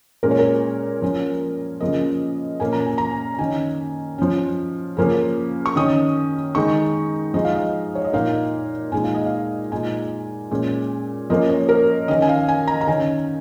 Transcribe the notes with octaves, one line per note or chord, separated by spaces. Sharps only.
A#2 G#3 C#4 A#4
C#5
A#4
F3 C#4
C#3 F3 A#3 D#5
A#2 A#3 C#4 G#5
A#5
G#5
A#5
G#5
D#3 C#4 G#5
F3 C#4
C#3 F3 A#3 C#4
C#6
D#3 C#4 D#6
D#3 G#3 D#4 C#6
F3 G#3 D#4 D#5
F5
D#5
C#5
D#5
A#2 A#3 D#4 F5
A#2 G#3 D#4 G#5
F5
D#5
F5
A#2 G#3 D#4 G#5
A#2 G#3 C#4
F3 A#3 C#4 D#5
C#5
A#4
D#3 C#4 D#5
G#5
F5
G#5
A#5
A#5
D#3 C#4 G#5